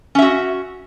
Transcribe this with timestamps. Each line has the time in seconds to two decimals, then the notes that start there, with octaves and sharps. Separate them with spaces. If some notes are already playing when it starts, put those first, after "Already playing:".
0.15 C#4
0.19 E5
0.22 F#4